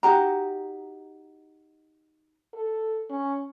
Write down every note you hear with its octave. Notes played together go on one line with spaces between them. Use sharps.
D#4 F#4 G4 A#5
A4
C#4